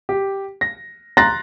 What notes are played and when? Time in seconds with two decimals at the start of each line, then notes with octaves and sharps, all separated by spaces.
0.09 G4
0.61 A#6
1.17 A#5 C6 F#6 A6 A#6